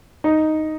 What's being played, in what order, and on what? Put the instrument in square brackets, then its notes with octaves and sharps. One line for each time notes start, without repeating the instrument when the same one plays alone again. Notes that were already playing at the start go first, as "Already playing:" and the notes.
[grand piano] D#4